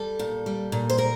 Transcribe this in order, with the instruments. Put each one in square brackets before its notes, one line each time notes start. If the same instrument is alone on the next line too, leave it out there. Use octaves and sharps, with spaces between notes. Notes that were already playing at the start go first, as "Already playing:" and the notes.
Already playing: [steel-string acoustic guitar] G3 A4
A#2
G3
A#2
C5
G3 A#4